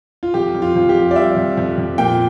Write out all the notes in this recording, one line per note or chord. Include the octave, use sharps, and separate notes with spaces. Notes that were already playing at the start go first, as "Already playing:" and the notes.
F4
F2 G4
F2
F4
F2
G4
F2
D5
G3 E5
F2
F2
F2
A#2 G5